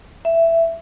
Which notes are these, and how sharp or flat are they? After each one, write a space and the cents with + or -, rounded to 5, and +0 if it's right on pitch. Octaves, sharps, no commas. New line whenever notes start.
E5 +10